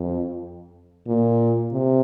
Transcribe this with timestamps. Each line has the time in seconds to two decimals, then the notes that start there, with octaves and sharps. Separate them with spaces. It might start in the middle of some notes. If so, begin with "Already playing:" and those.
Already playing: F2
1.08 A#2
1.73 C3